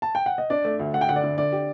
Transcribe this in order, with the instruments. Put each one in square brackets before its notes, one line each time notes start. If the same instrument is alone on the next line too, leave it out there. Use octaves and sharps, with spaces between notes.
[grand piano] A5
G5
F#5
D#5
[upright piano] D4 [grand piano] D5
[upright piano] A3
D2
[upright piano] A3 [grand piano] F#5
[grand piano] G5
[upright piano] D3 [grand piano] F#5
[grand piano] D5
[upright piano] D3
[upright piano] D3 [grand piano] D5
[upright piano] G4